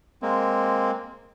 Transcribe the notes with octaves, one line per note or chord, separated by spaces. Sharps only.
G#3 A#3 C4